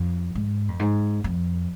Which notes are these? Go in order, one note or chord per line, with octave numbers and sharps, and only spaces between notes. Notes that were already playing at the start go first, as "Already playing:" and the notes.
Already playing: F2
G#2
F2
G#2
F2